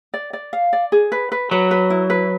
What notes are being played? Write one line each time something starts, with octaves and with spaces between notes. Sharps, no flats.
D5
D5
F5
D5
G#4
B4
B4
F#3 B4
B4
E4
B4